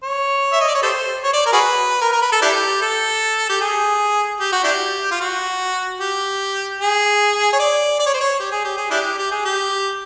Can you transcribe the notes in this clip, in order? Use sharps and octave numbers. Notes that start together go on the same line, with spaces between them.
C#5
E5
D#5
D5
C#5
G4 A4 C5
C#5
D5
A#4
F#4 G#4 B4
A#4
A#4
B4
A4
D4 E4 G4
A4
G4
G#4
G4
F#4
D4 E4 G4
F4
F#4
G4
G#4
C#5
D5
D5
C#5
C5
C#5
G4
G#4
G4
G#4
D4 E4 G4
G4
G#4
G4